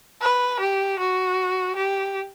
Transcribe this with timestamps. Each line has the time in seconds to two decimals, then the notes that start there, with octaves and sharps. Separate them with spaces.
0.22 B4
0.60 G4
0.99 F#4
1.76 G4